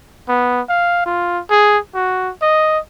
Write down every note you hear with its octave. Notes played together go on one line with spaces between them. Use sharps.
B3
F5
F4
G#4
F#4
D#5